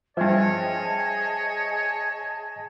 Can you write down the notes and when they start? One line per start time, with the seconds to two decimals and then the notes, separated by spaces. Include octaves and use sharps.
0.17 G2 F3 G#4 C5 C#5 D#5 E5 A5